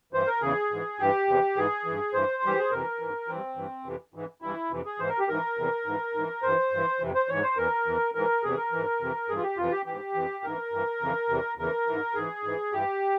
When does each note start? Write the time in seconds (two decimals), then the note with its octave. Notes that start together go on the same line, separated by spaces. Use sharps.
0.13 G2 E3 C5
0.27 A#4
0.42 E2 C#3 E3 G#4
0.71 G#2 E3
0.99 G2 E3 G4
1.27 E2 C3 E3
1.57 G#2 E3 G#4
1.85 G2 E3
2.13 G2 E3 C5
2.43 G2 E3 G4
2.59 G#4
2.71 F2 C3 E3 A#4
2.99 G#2 E3
3.28 G2 E3 C4
3.56 G2 E3
3.85 F2 C3 E3
4.14 G#2 E3
4.42 G2 E3 E4
4.71 F2 C3 E3
4.86 G#4
4.99 G#2 E3 C5
5.09 A#4
5.19 G4
5.28 G#2 E3 A#4
5.57 E2 C3 E3
5.86 G#2 E3
6.14 G#2 E3
6.42 G2 E3 C5
6.72 G2 E3
7.00 F2 C3 E3
7.15 C5
7.29 G#2 E3 C#5
7.43 C5
7.57 E2 E3 A#4
7.86 E2 E3
8.15 G#2 E3 A#4
8.43 E2 C3 E3 G#4
8.57 A#4
8.72 G#2 E3
9.00 F2 C3 E3
9.28 G2 E3 G#4
9.37 F4
9.43 G4
9.57 F2 C3 E3 F4
9.72 G4
9.86 G#2 E3 G4
10.15 F2 E3
10.44 G#2 E3 A#4
10.72 G2 E3
11.01 F2 C#3 E3
11.29 E2 C3 E3
11.57 E2 C#3 E3 A#4
11.87 G#2 E3
12.15 G#2 E3 G#4
12.44 G#2 E3
12.72 G2 E3 G4